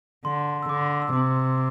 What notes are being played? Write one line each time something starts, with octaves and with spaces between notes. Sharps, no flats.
D3 C6
E6
D3 D6
E6
C3 D6